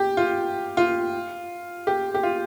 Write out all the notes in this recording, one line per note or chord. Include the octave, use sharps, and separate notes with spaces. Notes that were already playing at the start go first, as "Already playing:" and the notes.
Already playing: G4
F4
F4
G4
G4
F4